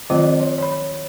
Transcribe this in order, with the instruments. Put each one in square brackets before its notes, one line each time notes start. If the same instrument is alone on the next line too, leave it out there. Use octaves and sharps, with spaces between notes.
[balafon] D#3 F3 F#3 A3 C4 F4
C#5
C#5 B5